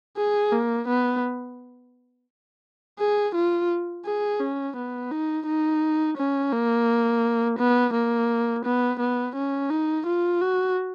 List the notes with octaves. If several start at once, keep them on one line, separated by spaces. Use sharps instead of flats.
G#4
A#3
B3
G#4
F4
G#4
C#4
B3
D#4
D#4
C#4
A#3
B3
A#3
B3
B3
C#4
D#4
F4
F#4